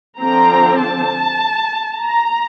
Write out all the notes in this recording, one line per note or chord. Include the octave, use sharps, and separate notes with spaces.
D3 F3 C4 A#5
A5
A#5